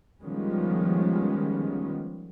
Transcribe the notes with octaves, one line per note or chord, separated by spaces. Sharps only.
D#3 F3 G3 G#3 B3 C#4